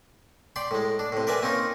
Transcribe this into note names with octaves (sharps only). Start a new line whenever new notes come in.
D5 G5 B5 C6
A2 G#3
D4
A2 C3
A#4 B4 D5 E5 G#5 A5
A#3 C4 C#4 D#4 F4